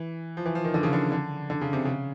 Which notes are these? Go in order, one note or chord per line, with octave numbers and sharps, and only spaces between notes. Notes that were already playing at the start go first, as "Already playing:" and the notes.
Already playing: E3
F3
E3
F3
D#3
D3
C#3
D3
D3
D3
C#3
C3
C#3